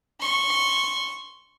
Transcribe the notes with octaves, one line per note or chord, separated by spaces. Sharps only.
C6 C#6